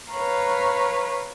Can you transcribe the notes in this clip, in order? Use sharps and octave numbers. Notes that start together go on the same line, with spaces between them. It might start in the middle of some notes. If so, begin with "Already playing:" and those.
B4 C#5 F5 A#5